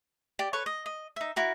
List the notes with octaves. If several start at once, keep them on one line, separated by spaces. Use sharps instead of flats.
G4 D5
A4 B4 C#5 C#6
D#5
D#5
D#4 E5
E4 F#4 A#4